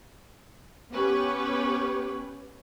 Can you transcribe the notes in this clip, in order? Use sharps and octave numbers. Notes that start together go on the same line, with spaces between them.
B3 C#4 G4 B4 C#5